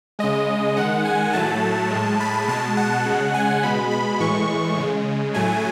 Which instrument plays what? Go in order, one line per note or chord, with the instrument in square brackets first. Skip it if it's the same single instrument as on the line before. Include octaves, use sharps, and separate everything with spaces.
[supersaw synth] C#3 G#3 D#5
D#3 G#3 F#5
G#5
A2 F#3 A3 A5
A2 G#3
B5
B2 G#3 A5
F#5
C#3 G#3
G#5
B2 G#3 B5
B5
A2 E3 G#3 C#6
C#3 G#3
A2 F#3 A3 G#5